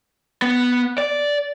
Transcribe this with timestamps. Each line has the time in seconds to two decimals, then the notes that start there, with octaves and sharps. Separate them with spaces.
0.42 B3
0.98 D5